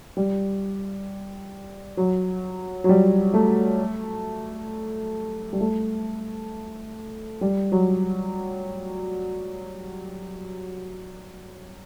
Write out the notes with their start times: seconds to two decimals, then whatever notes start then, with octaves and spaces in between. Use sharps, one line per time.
0.17 G3
1.97 F#3
2.84 F#3
2.89 G3
3.34 A3
5.53 G3
5.60 A3
7.41 G3
7.72 F#3